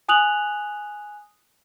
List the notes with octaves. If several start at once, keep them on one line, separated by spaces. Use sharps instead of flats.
G#5 D#6 F#6 F7 F#7